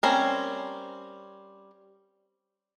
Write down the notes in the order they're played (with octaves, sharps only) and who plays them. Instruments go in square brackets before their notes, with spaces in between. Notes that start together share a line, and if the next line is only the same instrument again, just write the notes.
[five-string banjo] G3 C4 C#4 A#4